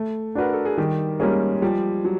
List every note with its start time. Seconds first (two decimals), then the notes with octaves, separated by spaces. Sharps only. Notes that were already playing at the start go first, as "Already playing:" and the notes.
Already playing: A3
0.35 D4 F#4 A#4 B4
0.53 A4
0.65 G#4
0.78 D#3 G3 G4
1.20 G3 G#3 A#3 C#4 G#4
1.62 F3 G3 G4
2.05 F#3